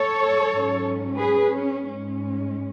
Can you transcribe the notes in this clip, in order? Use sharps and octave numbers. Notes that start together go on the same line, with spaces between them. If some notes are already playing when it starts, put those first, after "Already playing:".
Already playing: A4 C#5
G#2 F#3 C#4
G#4 B4
C#4
G#2 G#3 C#4